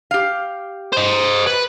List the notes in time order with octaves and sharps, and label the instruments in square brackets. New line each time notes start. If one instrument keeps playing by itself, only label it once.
[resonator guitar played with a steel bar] G4 F5
[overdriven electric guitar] C5 D#5
B4